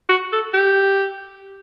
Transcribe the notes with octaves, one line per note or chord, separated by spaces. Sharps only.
F#4
A4
G4